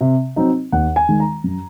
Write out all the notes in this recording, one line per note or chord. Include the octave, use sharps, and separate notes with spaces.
C3
F#3 C4 D#4
D#2 F#5
G#5
D#3 G#3
A#5
F#2